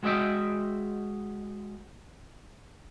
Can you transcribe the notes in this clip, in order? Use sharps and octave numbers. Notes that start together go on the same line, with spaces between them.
G#3 F#4 G#4 D#5 E5 G5